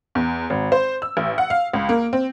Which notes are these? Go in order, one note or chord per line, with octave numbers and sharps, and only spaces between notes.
E2
G#1
C5
E6
A1
F#5
F5
C#2
A#3
C4